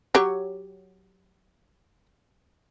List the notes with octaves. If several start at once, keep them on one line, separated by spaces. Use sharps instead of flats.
F#3 G4 C#5